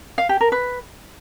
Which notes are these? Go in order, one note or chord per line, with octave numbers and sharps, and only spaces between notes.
F5
G4
A#4
B4